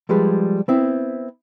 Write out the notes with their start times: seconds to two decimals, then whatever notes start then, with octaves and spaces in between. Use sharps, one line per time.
0.09 F3 G3 G#3 G#4 B4
0.68 B3 C4 E4